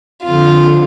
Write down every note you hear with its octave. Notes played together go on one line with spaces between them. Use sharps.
F2 D3 F4